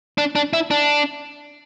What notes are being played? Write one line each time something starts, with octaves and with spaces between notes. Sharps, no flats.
D4
D4
E4
D4